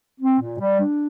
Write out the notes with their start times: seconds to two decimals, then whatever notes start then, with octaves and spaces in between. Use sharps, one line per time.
0.21 C4
0.40 A#2
0.60 G3
0.80 D4